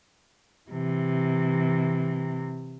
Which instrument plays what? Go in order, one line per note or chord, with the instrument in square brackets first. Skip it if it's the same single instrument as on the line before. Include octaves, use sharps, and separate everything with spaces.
[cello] C3 E3